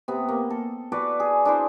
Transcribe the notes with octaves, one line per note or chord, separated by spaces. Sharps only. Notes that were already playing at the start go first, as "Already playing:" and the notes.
C3 B3
A#3
A4
F#4 A4 B4 D5
G#4
D4 E4 C5